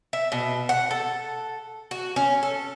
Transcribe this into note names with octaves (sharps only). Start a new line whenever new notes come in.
E5
B2
F#5
A4
F#4
C#4
A4